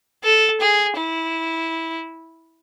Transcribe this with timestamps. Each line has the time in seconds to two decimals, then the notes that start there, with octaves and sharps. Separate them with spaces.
0.24 A4
0.61 G#4
0.96 E4